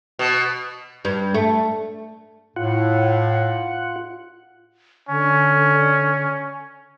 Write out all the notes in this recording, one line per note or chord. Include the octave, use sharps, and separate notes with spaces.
B2
G2
A3
A2 F4 F#5
D3 C#4